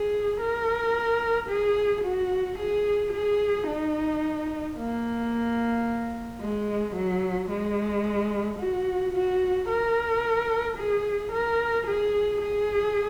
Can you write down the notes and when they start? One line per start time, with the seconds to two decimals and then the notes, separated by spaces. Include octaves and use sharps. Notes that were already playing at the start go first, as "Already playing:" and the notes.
Already playing: G#4
0.41 A#4
1.49 G#4
2.04 F#4
2.59 G#4
3.13 G#4
3.68 D#4
4.77 A#3
6.41 G#3
6.96 F#3
7.50 G#3
8.59 F#4
9.14 F#4
9.69 A#4
10.78 G#4
11.32 A#4
11.87 G#4
12.41 G#4